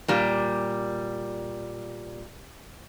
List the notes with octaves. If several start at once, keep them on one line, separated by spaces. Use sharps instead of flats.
A#2 G3